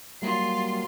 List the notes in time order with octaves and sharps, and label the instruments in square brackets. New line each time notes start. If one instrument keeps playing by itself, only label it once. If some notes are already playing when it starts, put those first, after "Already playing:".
[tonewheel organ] F#3 G3 A#3 [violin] F4 C7